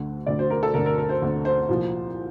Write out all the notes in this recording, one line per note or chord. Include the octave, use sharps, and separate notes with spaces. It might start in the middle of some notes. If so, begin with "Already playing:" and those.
Already playing: D2 D3 A3
D2 D3 A3 D5
C5
A#4
A4
D2 D3 A3 A#4
A#4
A#4
C5
D2 D3 A3
C5
C2 A#2 F3